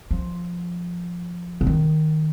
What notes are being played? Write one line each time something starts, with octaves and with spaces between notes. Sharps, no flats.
F3
D3
D#3